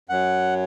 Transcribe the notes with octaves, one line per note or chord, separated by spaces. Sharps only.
F#2 F#3 F#5